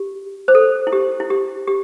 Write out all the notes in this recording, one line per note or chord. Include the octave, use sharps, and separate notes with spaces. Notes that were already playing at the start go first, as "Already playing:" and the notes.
Already playing: G4
C5
A4
E4
G4
E4
G4
G4